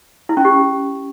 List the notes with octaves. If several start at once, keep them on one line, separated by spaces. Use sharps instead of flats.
E4
C#4
G4